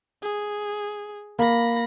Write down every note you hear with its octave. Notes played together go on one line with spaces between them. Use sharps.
G#4
A#3 B5 A#6